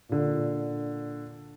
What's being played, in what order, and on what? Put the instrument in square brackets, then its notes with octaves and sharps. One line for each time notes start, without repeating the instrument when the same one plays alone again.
[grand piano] A#2 D3